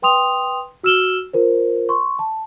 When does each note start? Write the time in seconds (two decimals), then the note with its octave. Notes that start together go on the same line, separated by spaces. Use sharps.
0.02 B4 G5 C6 D#6 F7
0.84 F#4 E6 F6 E7 F#7 G7
1.33 F4 A#4 C5
1.89 C6 C#6
2.19 A5